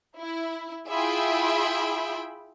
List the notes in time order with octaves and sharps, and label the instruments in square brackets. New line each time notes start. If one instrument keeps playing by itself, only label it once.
[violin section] E4
E4 F4 G#4 E5 G5 B5